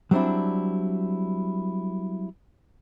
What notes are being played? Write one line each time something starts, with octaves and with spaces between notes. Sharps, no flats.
F#3 G3 C4 D4 E4